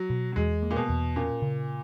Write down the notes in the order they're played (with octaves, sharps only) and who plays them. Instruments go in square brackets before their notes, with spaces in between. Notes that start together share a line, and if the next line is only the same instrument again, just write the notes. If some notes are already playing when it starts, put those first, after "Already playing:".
Already playing: [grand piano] F#3
[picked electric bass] B2
[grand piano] F#3
[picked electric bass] E2 [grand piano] G#3
[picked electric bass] A#3
[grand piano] A#2
B2
[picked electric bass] E2
[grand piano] A#2 [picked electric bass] C#4
[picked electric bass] C#3